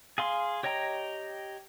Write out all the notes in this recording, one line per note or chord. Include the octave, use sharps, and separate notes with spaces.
G#4 F5 C6
G4 C#5 D#5 G5 A#5